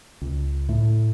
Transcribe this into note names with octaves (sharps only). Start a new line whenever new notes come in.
C#2
A2 A3